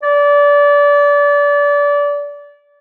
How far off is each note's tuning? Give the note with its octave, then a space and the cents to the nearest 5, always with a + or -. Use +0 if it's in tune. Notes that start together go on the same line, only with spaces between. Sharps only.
D5 -25